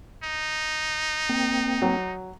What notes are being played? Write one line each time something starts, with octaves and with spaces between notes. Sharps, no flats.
D#4
A#3 C4 G5
F#3